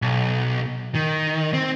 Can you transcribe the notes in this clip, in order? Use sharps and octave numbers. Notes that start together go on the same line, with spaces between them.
B1
D#3
C4